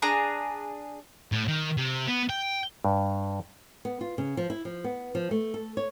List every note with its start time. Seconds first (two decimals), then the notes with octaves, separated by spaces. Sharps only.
0.02 D4 G#4 A#5
1.32 A2
1.48 D#3
1.77 C3
2.08 B3
2.30 G5
2.85 G2
3.85 B3
4.01 F4
4.18 C#3
4.37 F3
4.50 E4
4.65 F3
4.84 B3
5.15 F3
5.31 A3
5.54 A4
5.77 C#5